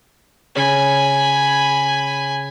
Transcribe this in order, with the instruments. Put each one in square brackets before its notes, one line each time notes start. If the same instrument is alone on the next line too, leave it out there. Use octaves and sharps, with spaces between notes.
[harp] C#3 C#5 [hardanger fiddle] G#5 B5